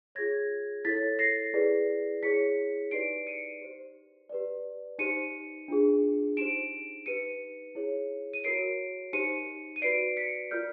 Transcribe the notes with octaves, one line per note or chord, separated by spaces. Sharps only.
F4 G#4 C#5 G#6 A#6
E4 A4 C#5 A6 B6
A#6 C7
E4 G#4 B4 D5
E4 G#4 C#5 B6 C#7
D#4 G4 B4 D5 C7 D7
C#7 D#7
G4 C5
G4 B4 D5
D#4 G4 C5 C#7 D#7
D4 F4 G#4
D#4 G4 C5 D7 E7
D#4 G4 B4 C#7 D#7
E4 G#4 C#5
D#7
F#4 A#4 C#5 C7 D7
D#4 G4 C5 C#7 D#7
D#7
F#4 B4 D5 C7 D7
B6 C#7
F4 A#4 D5 F6 G6